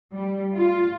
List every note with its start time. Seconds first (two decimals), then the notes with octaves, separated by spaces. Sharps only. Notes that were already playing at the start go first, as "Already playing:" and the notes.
0.13 G3
0.55 F4